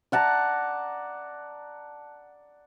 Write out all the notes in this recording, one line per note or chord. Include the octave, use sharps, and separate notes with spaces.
D5 F#5 A5 A#5